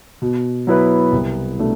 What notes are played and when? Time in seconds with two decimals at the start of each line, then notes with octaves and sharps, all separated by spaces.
0.22 B2
0.67 F#3 B3 E4 B4
1.12 C2
1.58 B2 A3 D4